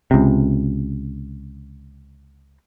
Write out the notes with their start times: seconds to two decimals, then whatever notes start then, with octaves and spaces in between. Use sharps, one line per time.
0.11 C#2 C3